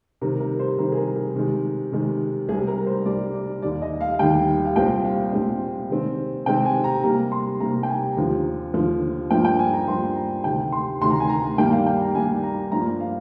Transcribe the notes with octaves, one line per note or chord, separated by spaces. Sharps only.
C3 D#3 G3 A#4
A#4
C5
C3 D#3 G3 A#4
G#4
A#4
G#4
C3 D#3 G#3
C3 D#3 G#3
C2 C3 G3 G#4
A#4
C5
C2 C3 G3 D5
D5
D#2 D#3 G3 D5
D#5
F5
F5
D#2 D#3 G3 G5
F5
C2 A#2 G#3 C4 G5
F5
C2 A#2 G#3 C4
C3 D#3 G#3 C4
C3 D#3 G#3 C4 G5
G#5
A#5
C3 G3 A#3 A#5
C6
C3 G3 A#3 A#5
G5
G#5
D#2 D3 F3
D#2 D3 F3
G2 F3 A#3 G5
G5
G#5
A#5
G2 F3 A#3 C6
A#5
D2 C3 D#3 G5
C6
D2 C3 D#3 C6
A#5
G#5
A#5
G2 D#3 G3 A#3 D4 G5
F5
G5
A#5
G2 D#3 G3 A#3 D4 G#5
A#5
G2 F3 A#3 D4 A#5
F5